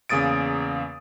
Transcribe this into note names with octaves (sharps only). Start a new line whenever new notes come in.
E2 C#3 A#3 D#6 A6 D7